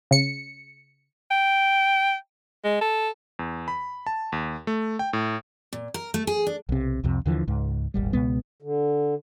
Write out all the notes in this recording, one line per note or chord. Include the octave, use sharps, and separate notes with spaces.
C#3 C#7
G5
G#3
A4
E2
B5
A5
D#2
A3
G5
A2
A#2
A#4
A3
G#4
D4
B1 C3
C2 F2 C3
D#2 D3 E3 F3
C#2 G#2
D#1 G#1 G3
C#2 B2 G#3 B3
D3